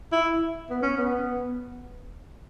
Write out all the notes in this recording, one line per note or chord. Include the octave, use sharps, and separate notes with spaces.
E4
B3
C#4
B3